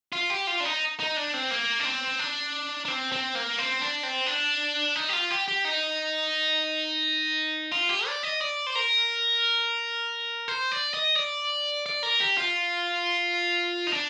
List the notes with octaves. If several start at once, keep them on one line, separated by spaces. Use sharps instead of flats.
F4
G4
F4
D4
D#4
D#4
D4
C4
A#3
D4
C4
D4
D4
C4
C4
A#3
C4
D4
C4
D4
D#4
G4
F4
G4
G4
D#4
F4
G4
D5
D#5
D5
C5
A#4
C5
D5
D#5
D5
D5
A#4
G4
F4
D#4
D4